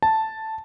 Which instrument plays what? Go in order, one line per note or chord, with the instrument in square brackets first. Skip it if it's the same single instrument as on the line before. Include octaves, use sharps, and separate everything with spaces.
[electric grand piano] A5